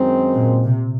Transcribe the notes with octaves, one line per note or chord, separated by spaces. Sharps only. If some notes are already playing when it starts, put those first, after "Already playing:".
Already playing: F#2 D#3 G#3 C4 D#4
A#2
C3